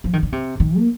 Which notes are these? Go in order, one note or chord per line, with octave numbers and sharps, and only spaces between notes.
F3
D#3
D3
C3
D#3
A#3